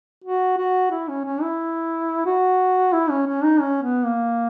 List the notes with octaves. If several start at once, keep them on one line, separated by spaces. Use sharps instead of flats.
F#4
F#4
E4
C#4
C#4
E4
F#4
E4
C#4
C#4
D#4
C#4
B3
A#3